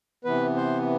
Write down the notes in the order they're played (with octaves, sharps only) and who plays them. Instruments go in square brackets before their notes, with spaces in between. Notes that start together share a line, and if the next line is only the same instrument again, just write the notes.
[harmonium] C3 E3 B3 B4
C5